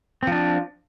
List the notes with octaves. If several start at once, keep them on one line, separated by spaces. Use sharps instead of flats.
F3 C4 D4